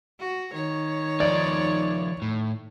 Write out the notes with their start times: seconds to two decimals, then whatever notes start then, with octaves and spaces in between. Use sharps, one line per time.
0.20 F#4
0.52 D#3 C#5
1.20 F3 D#4 D5
2.22 A2